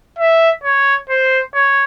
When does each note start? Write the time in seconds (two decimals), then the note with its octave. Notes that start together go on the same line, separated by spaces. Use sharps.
0.19 E5
0.64 C#5
1.10 C5
1.55 C#5